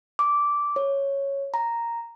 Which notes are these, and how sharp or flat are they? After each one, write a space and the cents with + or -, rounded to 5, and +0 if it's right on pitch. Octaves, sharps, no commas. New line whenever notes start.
D6 -10
C#5 -5
A#5 +0